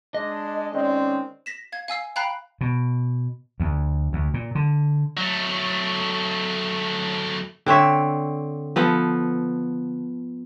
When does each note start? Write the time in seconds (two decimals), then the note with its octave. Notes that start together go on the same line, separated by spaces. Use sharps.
0.14 G#3 D4 D#5
0.73 D#3 G#3 C4 C#4 D5
1.46 A#6 B6 E7
1.72 F5 G#6
1.88 F5 G#5 E6 C7
2.16 F5 G5 A#5 B5 F#6 C7
2.61 B2
3.60 D2
4.13 D2
4.34 A#2
4.55 D3
5.17 F#3 A3
7.66 D3 C4 C#5 E5
8.76 F3 B3 A4